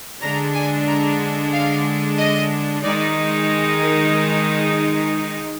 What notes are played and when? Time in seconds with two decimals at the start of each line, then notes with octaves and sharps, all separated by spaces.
0.21 D3 G#3 D4 A#5
0.54 G#5
0.87 A#5
1.52 F5
2.18 D#5
2.83 D#3 G#3 D#4 D5
3.81 A#4
4.14 A#4